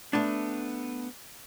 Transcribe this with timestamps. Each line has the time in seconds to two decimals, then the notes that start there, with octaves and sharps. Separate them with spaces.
0.13 A3 B3 D4